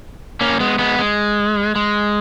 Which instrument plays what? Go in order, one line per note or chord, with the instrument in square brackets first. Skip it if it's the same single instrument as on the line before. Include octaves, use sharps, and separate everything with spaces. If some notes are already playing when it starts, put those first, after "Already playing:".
[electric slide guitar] A#3 C#4
G#3 B3
G#3 B3
G#3
G#3